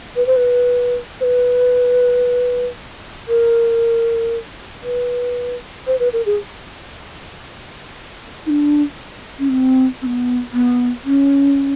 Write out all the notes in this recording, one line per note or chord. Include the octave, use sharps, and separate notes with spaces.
B4
C5
B4
C5
B4
A#4
B4
C5
B4
A#4
G#4
D#4
D4
C#4
C4
C4
B3
B3
C#4